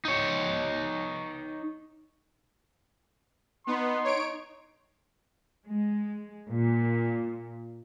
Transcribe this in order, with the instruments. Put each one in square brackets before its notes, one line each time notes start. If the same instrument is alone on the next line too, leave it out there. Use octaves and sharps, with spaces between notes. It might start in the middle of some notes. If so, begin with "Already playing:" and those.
[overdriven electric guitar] D#4 C#5
[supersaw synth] B3 [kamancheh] D#4 [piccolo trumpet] C6
[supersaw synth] C#5 D7
[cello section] G#3
A#2